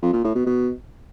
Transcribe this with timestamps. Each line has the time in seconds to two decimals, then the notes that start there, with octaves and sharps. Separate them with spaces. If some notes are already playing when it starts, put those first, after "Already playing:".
0.02 F2
0.13 A#2
0.24 A2
0.35 B2
0.46 B2